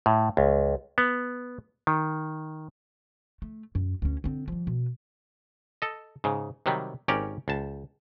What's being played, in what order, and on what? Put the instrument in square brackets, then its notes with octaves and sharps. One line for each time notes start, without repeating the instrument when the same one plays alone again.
[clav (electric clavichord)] A2
C#2
B3
D#3
[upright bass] A3
F#2
D2 C#4
D3 C4
F3 G3
B2
[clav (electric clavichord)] A4 D#5
G#2 C#3
C3 D#3 F#3 G3
G#1 C#4 G4 A#4 D5
C#2 A5